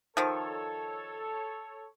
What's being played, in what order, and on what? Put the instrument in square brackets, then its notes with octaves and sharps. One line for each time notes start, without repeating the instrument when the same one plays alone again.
[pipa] D#3 F3 [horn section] A4 C#5